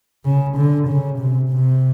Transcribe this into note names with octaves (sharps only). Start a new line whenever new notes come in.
C#3
D3
C#3
C3
C3